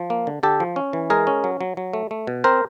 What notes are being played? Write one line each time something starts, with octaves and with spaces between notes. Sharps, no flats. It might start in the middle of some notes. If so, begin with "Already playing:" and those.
Already playing: F3
A#3
D3
D3 G4 A4
F3
C#4
E3
G#3 G#4 A#4
C#4
F#3
F#3
F#3
A3
A3
B2
C4 A#4 C5